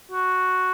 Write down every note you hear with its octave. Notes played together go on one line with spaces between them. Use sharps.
F#4